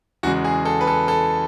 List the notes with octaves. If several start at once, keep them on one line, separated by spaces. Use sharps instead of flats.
E2 C#3 G#3 F#4
G#4
A4
B4
A4
A4